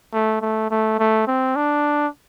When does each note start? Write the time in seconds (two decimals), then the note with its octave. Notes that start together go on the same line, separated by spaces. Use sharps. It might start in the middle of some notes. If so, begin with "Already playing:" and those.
0.13 A3
0.42 A3
0.71 A3
0.99 A3
1.27 C4
1.56 D4